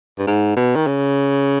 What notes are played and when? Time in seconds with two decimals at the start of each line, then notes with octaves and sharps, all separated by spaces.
0.19 G2
0.27 G#2
0.56 B2
0.76 D#3
0.87 C#3